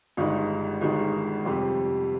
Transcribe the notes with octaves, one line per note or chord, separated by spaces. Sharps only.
G1 G2 D#3 G#3 D#4
G1 G2 D#3 G#3 D#4
F2 C3 G3 C4 G4